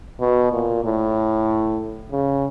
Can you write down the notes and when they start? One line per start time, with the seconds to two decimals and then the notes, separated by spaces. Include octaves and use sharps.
0.20 B2
0.52 A#2
0.85 A2
2.11 C#3